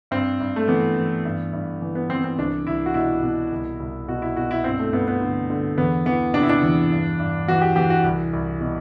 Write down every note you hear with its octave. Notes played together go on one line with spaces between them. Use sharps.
G2 C4
G2
A3
E3 B3
E3
G2
G2
E3
B3
E3 C4
C4
C2 D4
C2 E4
F#4
B2 E4
B2
C2
C2
B2 F#4
E4
B2 F#4
E4
G2 C4
A3
G2 B3
B3
D3
D3
E2 B3
E3 B3
C3 D4
E4
D4
E2
G2
G2
E3 F#4
G4
E3 G4
F#4
C2
C2
B2